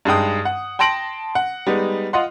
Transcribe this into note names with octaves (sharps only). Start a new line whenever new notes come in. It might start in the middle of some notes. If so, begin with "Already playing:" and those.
G2 G#3 D#4 G5 D#6
F#5
G5 A5 C6 A#6 D7 F#7
F#5
G3 G#3 B3 D#4
F4 D#5 F#5 C6